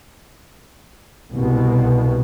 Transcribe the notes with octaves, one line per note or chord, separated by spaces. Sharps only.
C2 B2